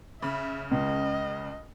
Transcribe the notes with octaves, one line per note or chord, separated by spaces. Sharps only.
C#3 E5 B5
C#2 D#5